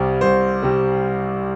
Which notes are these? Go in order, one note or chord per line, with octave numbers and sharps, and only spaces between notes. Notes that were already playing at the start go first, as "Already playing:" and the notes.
Already playing: C2 C3 G3
C2 C5
C3 G3